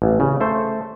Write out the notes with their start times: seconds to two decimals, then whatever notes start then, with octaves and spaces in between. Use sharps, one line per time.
0.02 A1
0.20 C#3
0.41 A3 C5